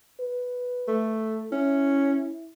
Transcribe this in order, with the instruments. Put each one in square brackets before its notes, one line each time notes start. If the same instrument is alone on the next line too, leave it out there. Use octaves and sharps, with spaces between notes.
[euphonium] B4
[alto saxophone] A3
[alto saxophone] C#4 [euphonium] E4